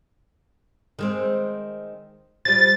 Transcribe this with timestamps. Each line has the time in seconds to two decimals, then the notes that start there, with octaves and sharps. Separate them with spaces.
0.99 D#3 G#3 C4
2.45 F3 G3 A6